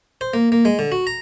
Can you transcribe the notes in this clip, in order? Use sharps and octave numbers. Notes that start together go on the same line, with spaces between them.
C5
A#3
A#3
G#3
D3
F#4
A#5